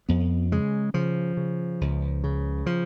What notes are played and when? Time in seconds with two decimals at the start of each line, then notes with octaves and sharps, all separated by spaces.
0.09 F2 B3
0.52 C#3 G#3
0.94 C#3 F3
1.37 C#3
1.81 C#2
2.24 C#3
2.66 F3